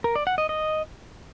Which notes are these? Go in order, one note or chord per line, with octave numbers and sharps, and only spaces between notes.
A#4
D5
F#5
D#5
D#5